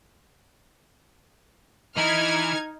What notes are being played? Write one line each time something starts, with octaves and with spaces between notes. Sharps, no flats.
E3 D#4 F6 G#6